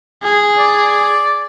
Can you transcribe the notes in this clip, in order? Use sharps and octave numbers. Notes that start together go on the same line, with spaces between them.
G#4
D5